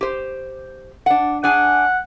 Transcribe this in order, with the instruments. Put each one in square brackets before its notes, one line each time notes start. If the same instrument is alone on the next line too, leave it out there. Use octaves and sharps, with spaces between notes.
[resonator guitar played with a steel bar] G4 C5
D4 F#5
[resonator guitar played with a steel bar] D4 G#4 G#5 [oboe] F#5